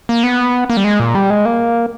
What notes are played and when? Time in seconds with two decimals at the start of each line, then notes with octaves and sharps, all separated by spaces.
0.09 A#3
0.23 B3
0.70 A#3
0.77 G3
0.84 G#3
1.00 A#2
1.15 G3
1.30 G#3
1.45 A#3